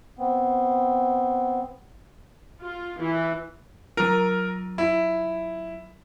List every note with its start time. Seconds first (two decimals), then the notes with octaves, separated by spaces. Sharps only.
0.19 B3 C4
2.60 F4
3.00 E3
3.97 F#3 F4 A#4
4.78 E4